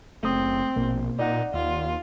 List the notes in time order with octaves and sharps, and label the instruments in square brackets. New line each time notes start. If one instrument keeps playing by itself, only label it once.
[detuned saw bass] F#1 [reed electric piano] A3 D#6 [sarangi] C4
[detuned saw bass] A#1 [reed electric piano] B2 A#3
[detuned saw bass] A#2 [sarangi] D#4 [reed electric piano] D5 F#5
[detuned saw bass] D#2 [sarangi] F4